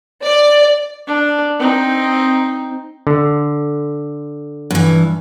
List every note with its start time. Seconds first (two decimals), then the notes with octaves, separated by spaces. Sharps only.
0.24 D5
1.07 D4
1.59 C4 D#4
3.07 D3
4.71 G2 E3